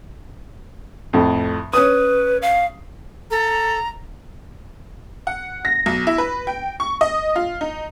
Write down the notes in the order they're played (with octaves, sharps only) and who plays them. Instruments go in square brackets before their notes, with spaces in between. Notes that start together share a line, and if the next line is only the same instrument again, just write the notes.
[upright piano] F2 A2
[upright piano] C#4 D#6 [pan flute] B4
[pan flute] F5
[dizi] A4 [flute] A#5
[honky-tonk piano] F#5
A#6
B1
E4
B4
G5
C#6
D#5
F4
D#4